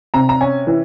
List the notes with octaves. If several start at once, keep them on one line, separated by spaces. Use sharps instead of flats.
C3 A#5
A#5
C#4 G#5
E3